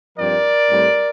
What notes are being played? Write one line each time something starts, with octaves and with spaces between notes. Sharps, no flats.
G2 F3 C4 A#4 D5
A2 G3 C4